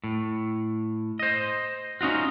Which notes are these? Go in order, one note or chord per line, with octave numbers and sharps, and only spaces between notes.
A2
C5 D#5
C#4 D#4 F4 F#4